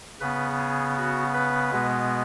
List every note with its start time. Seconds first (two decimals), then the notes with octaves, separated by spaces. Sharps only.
0.21 C#3 B3 B4
0.59 G#4
0.97 F#4
1.34 B4
1.72 B2 G#3 B3